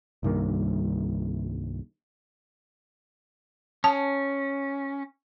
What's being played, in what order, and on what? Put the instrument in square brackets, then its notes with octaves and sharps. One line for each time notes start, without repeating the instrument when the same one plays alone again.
[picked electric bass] C2 G2 D#3 A#3
[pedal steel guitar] C#4 [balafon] A5